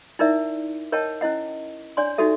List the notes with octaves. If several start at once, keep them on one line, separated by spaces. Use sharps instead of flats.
D#4 E4 A#4 D5 E5
A#4 C#5 D#5 G5 A5
C#4 E4 D#5 F#5
D4 C#5 D5 G#5 C6
D#4 F#4 G4 A4 E5